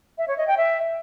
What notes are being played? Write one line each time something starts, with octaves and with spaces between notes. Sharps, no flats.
E5
C#5
D#5
G5
E5